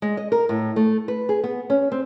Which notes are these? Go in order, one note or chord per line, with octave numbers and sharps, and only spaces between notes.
G#3
D#5
A#4
A2
A3
B4
G#4
B3
C#4
C4